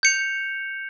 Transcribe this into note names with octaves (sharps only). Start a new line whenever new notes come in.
G6 C#7 F7